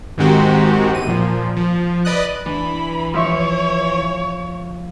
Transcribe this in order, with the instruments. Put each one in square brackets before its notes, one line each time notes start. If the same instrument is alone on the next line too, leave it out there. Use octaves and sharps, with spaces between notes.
[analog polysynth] G#2 D#3 G#3 C4 F#4 G4
E2 D#7
A#2 F3
F3
B4 D5 D#5 D#6 F#6
[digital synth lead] E3 [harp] D4 [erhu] B5
[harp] F3 E5 C#6 [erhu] C#5